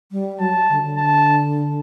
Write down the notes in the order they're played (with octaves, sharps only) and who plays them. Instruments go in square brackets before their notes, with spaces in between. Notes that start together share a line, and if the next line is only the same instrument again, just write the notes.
[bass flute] G3
[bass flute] F#3 [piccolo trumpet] A5
[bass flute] D3
D3
[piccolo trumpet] A5